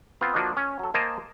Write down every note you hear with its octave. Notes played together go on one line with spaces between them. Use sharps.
B3 C4 F4
F3 A#3 D4 F#4 D#5
C#4
F#3 A4
A#3 A#4 C5 D#5 G#5 A5